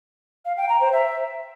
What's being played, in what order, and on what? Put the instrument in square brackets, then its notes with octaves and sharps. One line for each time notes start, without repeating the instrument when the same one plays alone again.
[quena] F5
G5
A#5
C5
E5